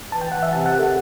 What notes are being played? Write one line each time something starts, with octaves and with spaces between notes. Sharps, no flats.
E3 A5
G5
E3 F#5
E5
C3 A5
F#5
D#3
A4